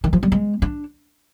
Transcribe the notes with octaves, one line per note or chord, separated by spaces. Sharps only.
D#3
F3
G3
G#3
D4